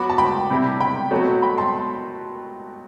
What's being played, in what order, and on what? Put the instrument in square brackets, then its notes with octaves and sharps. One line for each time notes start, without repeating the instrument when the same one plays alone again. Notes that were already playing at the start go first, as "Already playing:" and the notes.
Already playing: [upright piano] F#3 B3 F#4 [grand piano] B5 D6
[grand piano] A5
G5 B5
[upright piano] C3 G3 C4 E4 G4
[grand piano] G5 B5
[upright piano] B2 F#3 A3 C4 F#4
[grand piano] G5 B5
A5 C6